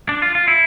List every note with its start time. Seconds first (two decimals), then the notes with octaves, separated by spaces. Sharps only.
0.09 D4
0.22 F4
0.35 F4
0.48 E4